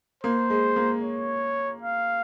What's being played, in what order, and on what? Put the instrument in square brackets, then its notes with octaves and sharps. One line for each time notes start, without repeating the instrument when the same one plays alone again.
[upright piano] A#3 [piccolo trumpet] C5
[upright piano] G#3
A#3
[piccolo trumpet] C#5
F5